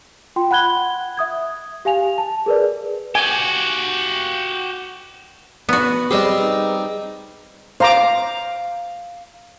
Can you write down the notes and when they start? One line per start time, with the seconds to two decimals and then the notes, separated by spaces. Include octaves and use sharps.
0.36 F4 G5 C6
0.51 F#5 B5 F#6 G#6 G7
1.17 E5 D#6 G#6
1.85 G4 F5 G#5 F7
2.18 A5
2.46 G#4 A#4 B4 D5
3.15 F#4 G4 G#5
5.69 B3 F#4 B4
6.11 G3 C4 G4 G#4 D#5
6.41 D#4
7.80 C5 F5 A#5 D6